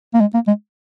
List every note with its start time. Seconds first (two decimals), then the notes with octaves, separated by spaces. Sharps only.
0.14 A#3
0.21 G#3
0.34 A#3
0.47 G#3